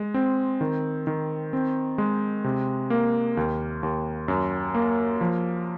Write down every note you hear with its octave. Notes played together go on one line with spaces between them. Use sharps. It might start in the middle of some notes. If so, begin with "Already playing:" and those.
Already playing: G#3
C4
D#3
D#3
C4
G#3
C3
A#3
D#2
D#2
F#2
A#3
F3